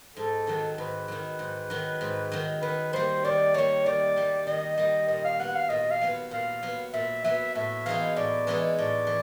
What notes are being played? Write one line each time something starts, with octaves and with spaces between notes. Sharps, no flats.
G#2 A4
D#3 F#3
G#2 B4
D#3 F#3
G#2
D#3 F#3
G#2
D#3 F#3
D#3 B4
G3 A#3 C5
D#3 D5
G3 A#3 C#5
D#3 D5
G3 A#3
D#3 D#5
G3 A#3 D#5
A#2 D#5
F5
F#3 B3 F#5
F5
A#2 D#5
F5
F#3 B3
A#2 F5
F#3 B3
A#2 E5
F#3 B3 E5
A2 E5
E3 G#3 B3 D#4 F5
A2 D5
E3 G#3 B3 D#4
A2 D5
E3